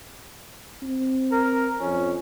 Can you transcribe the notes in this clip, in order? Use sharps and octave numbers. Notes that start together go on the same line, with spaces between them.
C4
A#4
F2 C#4